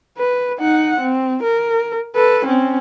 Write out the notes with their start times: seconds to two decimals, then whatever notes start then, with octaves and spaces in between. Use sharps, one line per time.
0.18 B4
0.60 D#4 F#5
1.01 C4
1.43 A#4
2.15 A4 B4
2.46 C4 C#4